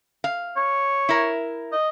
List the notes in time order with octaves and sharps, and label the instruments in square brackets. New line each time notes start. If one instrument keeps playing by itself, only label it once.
[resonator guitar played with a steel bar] F5
[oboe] C#5
[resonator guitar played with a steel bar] E4 A#4
[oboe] D#5